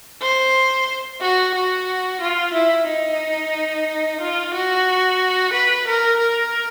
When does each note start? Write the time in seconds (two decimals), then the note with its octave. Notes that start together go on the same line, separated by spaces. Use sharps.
0.22 C5
1.21 F#4
1.55 F#4
2.21 F4
2.54 E4
2.87 D#4
4.21 F4
4.54 F#4
5.53 B4
5.88 A#4
6.20 A#4